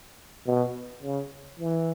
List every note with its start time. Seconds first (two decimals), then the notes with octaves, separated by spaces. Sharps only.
0.46 B2
1.03 C#3
1.59 E3